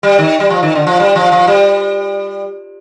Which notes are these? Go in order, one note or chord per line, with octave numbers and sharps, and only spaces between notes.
G3
D#3
G3
F3
D#3
D3
F3
G3
F3
F3
G3